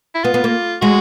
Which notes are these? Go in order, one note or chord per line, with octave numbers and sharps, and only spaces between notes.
E4
B3 F4
B3
A#3
G#3 F#4